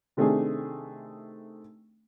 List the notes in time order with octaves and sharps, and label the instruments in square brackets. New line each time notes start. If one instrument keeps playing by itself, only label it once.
[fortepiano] C3 D#3 A3 C4 D4 G#4